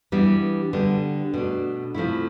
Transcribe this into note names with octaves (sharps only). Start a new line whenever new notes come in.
E3 G3 B3 D4
D3 G3 B3
B2 A3 D4
C3 F3 A3 E4